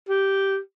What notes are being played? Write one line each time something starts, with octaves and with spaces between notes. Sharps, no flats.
G4